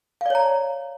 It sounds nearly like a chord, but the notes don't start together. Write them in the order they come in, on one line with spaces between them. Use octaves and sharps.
F5 D5 C#5 A#5